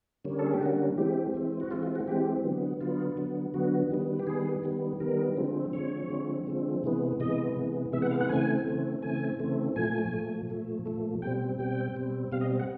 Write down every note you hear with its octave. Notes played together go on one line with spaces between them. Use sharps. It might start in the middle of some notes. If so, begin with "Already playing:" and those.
D3 G3 A#3 C#4
A4
G#4
G4
D3 G3 A#3 C#4 F#4
E3 G#3 C4 G4
E3 G#3 C4
F#4
E3 G#3 C4 F4
F4
F#4
E3 G#3 C4 G4
D3 F#3 B3
D3 F#3 B3 F4
D3 F#3 B3
D3 F#3 B3 F#4
D#3 G3 B3
G4
D#3 G3 B3 G#4
D#3 G3 B3
D#3 G3 B3 A#4
D3 F3 G#3 C4
D3 F3 G#3 C4 C#5
D3 F3 G#3 C4
D3 F3 G#3 C4
C3 E3 G#3 B3
C3 E3 G#3 B3 D#5
C3 E3 G#3 B3
C3 E3 G#3 B3 E5
F#5
F5
F#5
C#3 E3 A3 C4 G#5
C#3 E3 A3 C4
C#3 E3 A3 C4 G#5
C#3 E3 A3 C4
A#2 F3 A3 G#5
A#2 F3 A3
A#2 F3 A3
A#2 F3 A3
B2 G3 C4 G5
B2 G3 C4 G5
B2 G3 C4
B2 G3 C4 F5
D#5
F#5